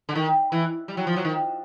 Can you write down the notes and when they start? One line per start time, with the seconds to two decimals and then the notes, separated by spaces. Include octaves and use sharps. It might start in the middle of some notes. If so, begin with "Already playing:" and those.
0.09 D3
0.15 D#3
0.52 E3
0.88 G3
0.97 F#3
1.07 F3
1.16 F#3
1.25 D#3